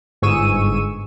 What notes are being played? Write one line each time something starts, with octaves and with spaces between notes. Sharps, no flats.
G1 G#2 G#4 C#6 E6 D#7